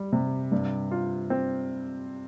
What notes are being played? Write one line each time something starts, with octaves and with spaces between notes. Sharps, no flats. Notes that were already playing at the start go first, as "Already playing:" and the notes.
Already playing: G3
C3
G2
F4
C4